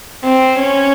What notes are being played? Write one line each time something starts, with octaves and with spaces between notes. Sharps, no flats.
C4
C#4